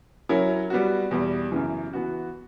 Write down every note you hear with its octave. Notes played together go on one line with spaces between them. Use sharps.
F#3 C#4 E4 A#4 C#5
G3 B3 F#4
E2 B2 G3
F#2 C#3 E3
E3 B3 F#4